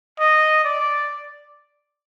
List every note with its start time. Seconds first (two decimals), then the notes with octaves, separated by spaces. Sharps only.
0.20 D#5
0.65 D5